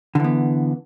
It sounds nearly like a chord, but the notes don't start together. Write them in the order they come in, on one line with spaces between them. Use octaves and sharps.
D3 E3 B3